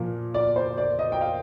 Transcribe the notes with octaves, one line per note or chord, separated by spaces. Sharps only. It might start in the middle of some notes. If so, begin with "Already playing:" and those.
Already playing: A#2 F3 A#3
D5
C5
D5
D#5
G5
F5